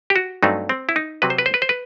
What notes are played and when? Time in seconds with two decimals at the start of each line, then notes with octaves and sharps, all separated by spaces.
0.10 G4
0.16 F#4
0.43 G2 F#3 A3 C4 D#4
0.69 C4
0.89 E4
0.96 D#4
1.22 C3 F#3 C4 B4
1.30 C5
1.38 B4
1.46 C5
1.54 B4
1.62 C5
1.69 B4